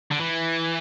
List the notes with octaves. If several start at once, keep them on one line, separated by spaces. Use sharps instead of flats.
D3
E3